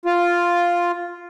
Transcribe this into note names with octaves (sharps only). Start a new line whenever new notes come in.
F4